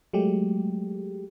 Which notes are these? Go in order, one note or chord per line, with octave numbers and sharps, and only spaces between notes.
F#3 G#3 A3 G4